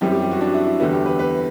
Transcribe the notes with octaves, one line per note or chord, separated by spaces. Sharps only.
F#2 E3 G3 C4 G4
G4
G4
F#4
D4
E4
E4
E2 D3 G3 B3 E4
G4
B4
B4